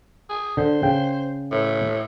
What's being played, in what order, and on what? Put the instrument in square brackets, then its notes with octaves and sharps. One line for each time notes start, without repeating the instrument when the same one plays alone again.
[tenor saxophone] G#4
[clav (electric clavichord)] D3 [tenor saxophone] C5
[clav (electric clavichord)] C#3 G5
[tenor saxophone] A2